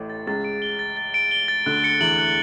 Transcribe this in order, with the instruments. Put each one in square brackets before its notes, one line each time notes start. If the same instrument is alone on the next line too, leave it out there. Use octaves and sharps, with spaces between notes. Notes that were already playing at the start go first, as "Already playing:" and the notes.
Already playing: [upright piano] A1 A2
[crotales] A6
[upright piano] C#2 C#3 [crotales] A6
[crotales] D7
G7
A6
A6
D7
G7
A6
[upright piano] D2 D3 [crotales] F#6
[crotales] C#7
[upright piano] E2 E3 [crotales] F#7
[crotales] F#6